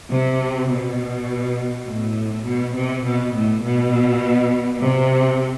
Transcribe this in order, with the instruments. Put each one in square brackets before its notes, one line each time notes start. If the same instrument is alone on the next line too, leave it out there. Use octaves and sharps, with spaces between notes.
[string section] C3
B2
A2
B2
C3
B2
A2
B2
C3